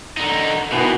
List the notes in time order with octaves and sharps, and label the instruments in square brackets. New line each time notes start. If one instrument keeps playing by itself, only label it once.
[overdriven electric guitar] D3 D#4
[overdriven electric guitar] B2 [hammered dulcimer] D#3 E3 B3